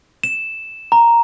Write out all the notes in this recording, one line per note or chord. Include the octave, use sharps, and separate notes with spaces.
E7
A#5